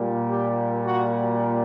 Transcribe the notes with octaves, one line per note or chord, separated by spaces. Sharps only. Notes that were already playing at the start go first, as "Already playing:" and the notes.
Already playing: A#2 G3 A#3
G4
F#4